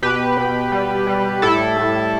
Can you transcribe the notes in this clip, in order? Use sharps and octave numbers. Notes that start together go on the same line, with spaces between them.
B2 G4 B4
B2
G3
G3
A2 E4 A4
A2